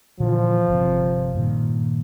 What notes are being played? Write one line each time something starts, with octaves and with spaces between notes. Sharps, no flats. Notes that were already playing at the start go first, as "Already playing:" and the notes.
A#2 D3 E3 F3
G1 C3
G2 A#2 D#3